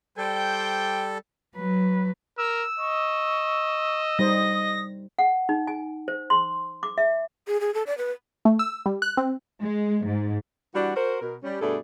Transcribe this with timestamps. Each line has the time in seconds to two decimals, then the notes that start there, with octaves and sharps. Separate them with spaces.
0.18 G3 A4 C5 D5 G5
1.56 F#3 B4
2.38 A#4 E6
2.79 D#5 C#6
4.19 G3 D#4 C5 D#6 A#6
5.19 F#5
5.49 D#4
5.67 G#5
6.08 C5
6.30 C6
6.83 D6
6.98 E5
7.48 G#4
7.61 G#4
7.74 A4
7.87 D5
7.98 B4
8.45 A3
8.59 E6
8.86 G3
9.02 F#6
9.17 C4
9.61 G#3
10.05 G#2
10.75 E3 G3 D4 F#4
10.96 F#4 A#4 C5
11.21 B2 A#4
11.43 G3 C#4
11.61 G2 B2 A3 G#4 A4 D5